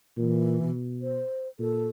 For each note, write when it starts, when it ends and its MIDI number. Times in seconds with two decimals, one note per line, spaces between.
0.17 0.57 46
0.17 0.71 52
0.62 1.21 47
1.02 1.47 72
1.59 1.89 46
1.59 1.89 69